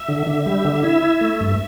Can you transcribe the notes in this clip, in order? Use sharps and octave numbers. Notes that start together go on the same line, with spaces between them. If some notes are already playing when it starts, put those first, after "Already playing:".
Already playing: E5
D3
D3
G3
D3
E4 E5
E4
A3
G2